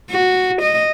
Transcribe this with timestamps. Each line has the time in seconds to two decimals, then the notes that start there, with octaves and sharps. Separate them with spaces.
0.11 F#4
0.61 D#5